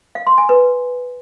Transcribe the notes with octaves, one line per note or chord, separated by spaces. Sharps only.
F5
C6
G#5
B4